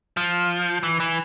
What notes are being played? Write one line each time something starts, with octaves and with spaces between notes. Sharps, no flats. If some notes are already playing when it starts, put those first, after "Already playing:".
F3
E3
E3